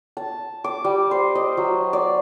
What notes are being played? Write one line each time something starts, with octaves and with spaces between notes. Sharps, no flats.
A5
D6
G3
C5
D#5
F#3
D5